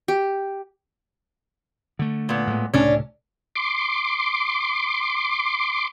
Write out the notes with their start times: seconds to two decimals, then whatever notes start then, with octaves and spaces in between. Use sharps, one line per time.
0.08 G4
1.99 D3 A3
2.29 A#2 B3
2.47 A2 G#3
2.74 C#2 A2 C3 C#4 D4
3.56 C6 D6